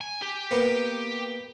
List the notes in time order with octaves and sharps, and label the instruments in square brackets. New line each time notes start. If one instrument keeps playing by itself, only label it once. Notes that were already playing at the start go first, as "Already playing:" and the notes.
[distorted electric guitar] G#5
G4
[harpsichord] A#3 B3